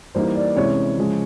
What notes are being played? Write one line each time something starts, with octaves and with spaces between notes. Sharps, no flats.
E3 G3 A#3 D#4 C5
D5
C3 E3 G#3 C#4 E4 C#5
C#3 F3 G#3